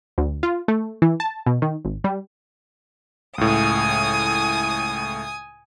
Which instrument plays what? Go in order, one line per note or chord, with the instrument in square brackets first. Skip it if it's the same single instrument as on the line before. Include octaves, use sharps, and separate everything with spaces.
[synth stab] D2
F4
A3
E3
A5
B2
D#3
G#1
G3
[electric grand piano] C#2 A2 [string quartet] G#5 D#6